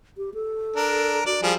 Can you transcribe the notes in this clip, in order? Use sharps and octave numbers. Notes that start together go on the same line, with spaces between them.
G4
A4
D4 A#4
F#4 D5
F3 G3 G#4